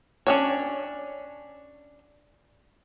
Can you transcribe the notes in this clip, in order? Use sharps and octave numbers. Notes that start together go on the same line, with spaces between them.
C#4 D4 C#5